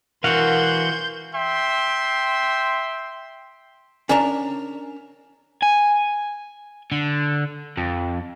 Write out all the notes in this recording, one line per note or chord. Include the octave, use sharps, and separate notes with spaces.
E3 F#4 A#4 F5 F#5 C6 G6
E5 G5 C6
C#4 D4 A#4 A5 A#5
G#5
D3
F2